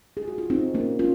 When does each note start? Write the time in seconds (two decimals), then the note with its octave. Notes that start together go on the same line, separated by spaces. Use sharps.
0.17 G#4
0.28 F#4
0.38 F4
0.50 C4 D#4
0.74 A#3 C#4
0.99 C#4 F4